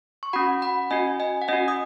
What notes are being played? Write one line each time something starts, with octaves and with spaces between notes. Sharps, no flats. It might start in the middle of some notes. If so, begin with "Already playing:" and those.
C#6
C#4 F#4 F#5 B5
F#5 B5
C#4 F#4 D#5 G#5
D#5 G#5
F#5
C#4 F#4 D#5 G#5
D#6